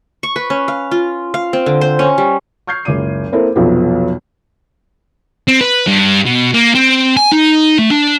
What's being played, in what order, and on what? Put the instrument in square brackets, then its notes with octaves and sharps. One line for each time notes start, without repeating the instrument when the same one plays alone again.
[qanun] C#6
B4
C#4
F5
F4
F5
C4
D3
C5
C#4
G3
[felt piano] C#6 F6 G6 G#6 C7
F#1 C#2 D6 D#7
A#3 C4 E4 A4 A#4
B1 F2 C3 F3 F#3 B3
[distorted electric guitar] C4
B4
G2
B2
A#3
C4
G#5
D#4
A3
D4